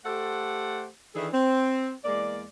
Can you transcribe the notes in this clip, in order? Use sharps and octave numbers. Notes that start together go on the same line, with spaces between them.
A3 G4 A4 C5 F#5
D#3 E3 D4 E4 G#4 A4
C4
E2 G#3 A#3 D5